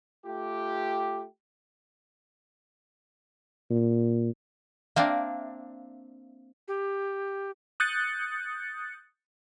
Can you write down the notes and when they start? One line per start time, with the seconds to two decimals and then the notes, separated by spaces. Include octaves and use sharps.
0.24 A3 F4 G4
3.71 A#2
4.96 A#3 C4 D4 E5 F5
6.68 G4
7.80 D#6 F#6 G6 A6 C#7